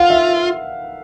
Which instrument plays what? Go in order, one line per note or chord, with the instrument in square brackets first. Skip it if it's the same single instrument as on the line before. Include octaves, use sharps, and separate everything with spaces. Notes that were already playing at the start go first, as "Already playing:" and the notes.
Already playing: [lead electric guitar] F4 [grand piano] F5 F#5
[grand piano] E5